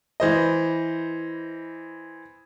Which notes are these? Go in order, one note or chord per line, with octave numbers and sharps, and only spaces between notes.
E3 C5 D#5